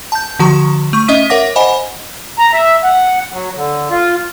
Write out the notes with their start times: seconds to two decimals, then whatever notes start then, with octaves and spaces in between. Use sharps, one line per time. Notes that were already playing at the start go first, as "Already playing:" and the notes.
0.12 A5 G6
0.39 D3 F3 F#4 A#5 C#6
0.93 A3 C#6
1.08 C#4 D#5 E5 D#6 B6 D#7
1.30 A#4 C#5 E5 F#5 D6 A#6
1.56 C5 D#5 F#5 G#5 B5
2.39 A#5
2.53 E5
2.83 F#5
3.33 F#3
3.56 D3
3.90 F4